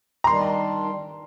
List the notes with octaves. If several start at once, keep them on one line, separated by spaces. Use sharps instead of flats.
A#5
D#3 G3 D4 C6